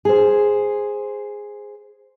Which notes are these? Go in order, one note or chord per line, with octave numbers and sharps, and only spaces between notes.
G#4 C5